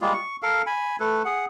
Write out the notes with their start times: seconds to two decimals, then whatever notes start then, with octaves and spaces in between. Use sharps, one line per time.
0.01 G3 G#3 A#3 F4
0.13 C#6
0.43 A4 A#4 F5
0.67 G#5 B5
1.00 A3 A4 B4
1.25 G#4 F#5